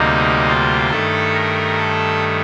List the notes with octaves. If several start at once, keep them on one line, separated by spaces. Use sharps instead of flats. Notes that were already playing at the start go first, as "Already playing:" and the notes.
Already playing: D2 C3 G3 A#3 D#4
F4
G2 D#3 A3 A4
A#4
A4